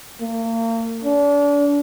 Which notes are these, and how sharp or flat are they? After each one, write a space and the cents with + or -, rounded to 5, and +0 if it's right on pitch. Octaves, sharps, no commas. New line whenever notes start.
A#3 -40
D4 -35